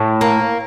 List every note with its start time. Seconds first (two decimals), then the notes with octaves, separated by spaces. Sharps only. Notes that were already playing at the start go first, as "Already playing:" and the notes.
Already playing: A2
0.21 A#3